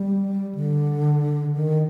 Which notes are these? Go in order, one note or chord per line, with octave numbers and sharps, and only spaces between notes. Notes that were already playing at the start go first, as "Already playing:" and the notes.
Already playing: G3
D3
D#3